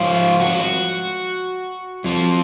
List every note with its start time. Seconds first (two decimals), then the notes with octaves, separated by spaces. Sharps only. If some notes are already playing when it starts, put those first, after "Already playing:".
Already playing: G#2 F3 F4
0.40 F#4
2.04 F2 F3